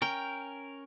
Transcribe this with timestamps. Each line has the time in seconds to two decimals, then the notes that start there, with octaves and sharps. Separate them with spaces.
0.02 C#4 A#4 G5